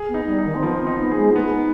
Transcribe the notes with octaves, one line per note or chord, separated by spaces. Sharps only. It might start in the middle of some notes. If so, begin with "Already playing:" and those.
Already playing: G#4
B3
D#4
G3
D#4
D#3
C4
F3 B3
C4
D#4
B3
G#4
G#3
F4
B3 D#4